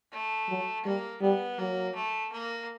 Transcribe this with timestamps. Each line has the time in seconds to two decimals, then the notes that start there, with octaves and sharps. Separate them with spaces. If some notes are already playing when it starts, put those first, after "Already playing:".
0.12 A3
0.49 F#3
0.85 G3 A#3
1.22 G3 B3
1.58 F#3 A#3
1.95 A3
2.32 A#3